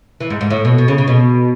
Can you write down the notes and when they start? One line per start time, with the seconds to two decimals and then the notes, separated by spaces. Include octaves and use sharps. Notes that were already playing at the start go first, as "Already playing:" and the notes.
0.20 E3
0.30 G#2
0.41 G#2
0.50 A2
0.65 B2
0.78 B2
0.88 C#3
0.98 C#3
1.08 B2